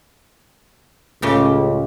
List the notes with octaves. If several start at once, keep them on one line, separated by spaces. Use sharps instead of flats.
C#2 A2 C#3 G4